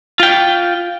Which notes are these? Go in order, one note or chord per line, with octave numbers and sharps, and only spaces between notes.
F4 G5